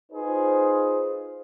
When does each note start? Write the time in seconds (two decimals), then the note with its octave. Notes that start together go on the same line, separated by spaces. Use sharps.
0.12 D#4 F4 G#4 B4 C5